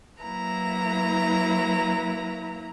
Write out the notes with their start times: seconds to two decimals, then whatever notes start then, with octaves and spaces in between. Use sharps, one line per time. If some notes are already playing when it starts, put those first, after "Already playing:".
0.22 F#3 A#3 E4 B4 A#5